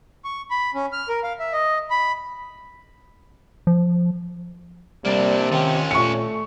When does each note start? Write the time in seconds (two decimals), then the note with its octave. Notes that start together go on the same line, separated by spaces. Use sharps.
0.25 C#6
0.51 B5
0.74 C#4
0.93 F6
1.09 A#4
1.23 F5
1.39 E5
1.53 D#5
1.90 B5
3.67 F3
5.05 C3 G3 A#3 D4
5.52 D#3 C#4 F4
5.91 A#2 A3 C#6 C#7